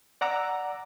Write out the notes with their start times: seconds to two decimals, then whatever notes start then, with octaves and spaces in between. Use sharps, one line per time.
0.21 D5 F#5 A#5 D6 E6